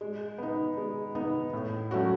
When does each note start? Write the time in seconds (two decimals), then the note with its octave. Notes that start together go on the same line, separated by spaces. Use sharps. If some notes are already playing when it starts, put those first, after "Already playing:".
0.01 G#3
0.38 B3 D#4
0.77 G#3
1.15 B3 D#4
1.53 A2
1.91 F#3 A3 C#4 F#4